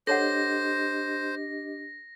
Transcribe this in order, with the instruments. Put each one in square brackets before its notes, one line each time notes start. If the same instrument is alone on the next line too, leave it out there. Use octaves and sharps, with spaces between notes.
[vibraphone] D4 G4 D#5 [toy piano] A4 C#5 F#5 [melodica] C5 [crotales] A#6